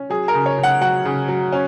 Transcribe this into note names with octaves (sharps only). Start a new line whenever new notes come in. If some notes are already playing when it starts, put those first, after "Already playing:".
Already playing: C#4
F#3 G#4
A#4
C#3
C#5
C#3
F#5
F#3 F#5
C#3
F#3
C#4